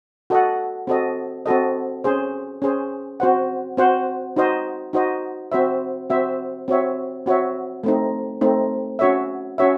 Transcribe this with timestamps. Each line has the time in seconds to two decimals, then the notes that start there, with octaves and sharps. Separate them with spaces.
0.30 F#4 A4 D#5 F#5
0.87 C4 F#4 A4 D#5
1.46 C4 F#4 A4 D#5
2.04 C#4 G#4 C5
2.62 C#4 G#4 C5
3.20 C4 F#4 C5 F#5
3.77 C4 F#4 C5 F#5
4.36 D#4 F#4 C5 D#5
4.93 D#4 F#4 C5 D#5
5.52 C4 F#4 C5 E5
6.10 C4 F#4 C5 E5
6.68 C4 F#4 C#5 E5
7.26 C4 F#4 C#5 E5
7.84 A3 C4 D#4
8.41 A3 C4 D#4
8.99 C#4 F#4 C#5 E5
9.58 C#4 F#4 C#5 E5